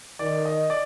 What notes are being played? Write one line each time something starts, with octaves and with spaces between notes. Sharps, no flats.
D#3 D5
D#5
D5